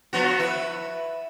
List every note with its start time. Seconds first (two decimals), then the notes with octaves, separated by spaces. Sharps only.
0.13 F3 B3 F#4
0.39 E4 B4